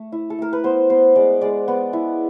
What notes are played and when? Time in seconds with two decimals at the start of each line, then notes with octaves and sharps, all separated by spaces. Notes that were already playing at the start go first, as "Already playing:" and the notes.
Already playing: A3
0.12 E4
0.30 A4
0.39 A3 A#4
0.53 B4
0.64 B3 C5
0.90 B3 C5
1.16 G#3 D5
1.41 G#3 D5
1.68 B3
1.93 E4